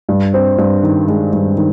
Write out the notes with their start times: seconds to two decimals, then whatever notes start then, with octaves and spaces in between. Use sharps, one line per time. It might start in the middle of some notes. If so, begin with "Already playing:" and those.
0.09 G2
0.34 C4
0.58 G2
0.83 D#3
1.07 G#3
1.33 G2
1.57 D#3